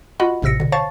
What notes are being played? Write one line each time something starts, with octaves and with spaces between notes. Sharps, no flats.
F4 F#4 D#5 F#5 B5
A1 A2 C3 E6 A#6 C#7
B2 D3
C5 C#5 F5 A5 C#6 A6